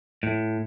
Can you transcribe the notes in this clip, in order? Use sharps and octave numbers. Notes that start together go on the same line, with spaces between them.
A2